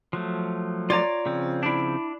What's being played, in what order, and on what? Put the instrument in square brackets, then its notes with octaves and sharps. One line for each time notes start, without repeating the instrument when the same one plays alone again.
[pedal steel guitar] F3 F#3 A3
[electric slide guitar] F4 C#5 A#5 [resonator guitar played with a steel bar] D5
[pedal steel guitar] C#3 F3 C4
[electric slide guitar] D4 E4